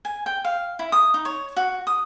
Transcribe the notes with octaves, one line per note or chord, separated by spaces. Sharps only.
G#5
G5
F5
E4
D#6
D#4
C#5
F#4
D#6